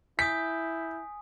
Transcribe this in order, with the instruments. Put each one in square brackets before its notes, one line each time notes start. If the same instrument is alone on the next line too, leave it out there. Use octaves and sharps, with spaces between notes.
[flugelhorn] E4 [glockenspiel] G#5 D#6 [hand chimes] G6 [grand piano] B6